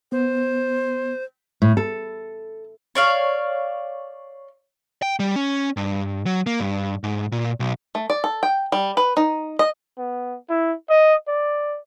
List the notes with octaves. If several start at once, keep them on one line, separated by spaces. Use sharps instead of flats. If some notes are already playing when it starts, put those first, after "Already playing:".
B3 C5
A2
A4
C#5 D5 F5
G5
G3
C#4
G2
F#3
A#3
G2
G#2
A#2
B1
A3
D5
A4
G5
G3
B4
D#4
D#5
B3
E4
D#5
D5